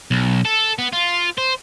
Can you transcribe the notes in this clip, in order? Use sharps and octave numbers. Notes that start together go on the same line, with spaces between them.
B1
A4
B3
F4
C5